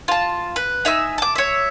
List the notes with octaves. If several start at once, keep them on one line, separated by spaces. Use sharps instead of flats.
F4 A5
B4
D#4 E5 G#5 E6
A5 D6
C#5 E5